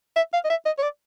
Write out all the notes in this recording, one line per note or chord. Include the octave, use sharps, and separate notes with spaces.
E5
F5
D#5
E5
D#5
C#5
D5